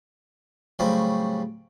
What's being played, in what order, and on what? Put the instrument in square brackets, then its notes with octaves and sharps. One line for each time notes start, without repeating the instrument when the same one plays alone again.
[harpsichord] A2 C#3 F#3 G3 C4